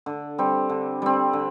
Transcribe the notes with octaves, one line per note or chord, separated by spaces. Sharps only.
D3
G3 C4
D3
G3 C4
D3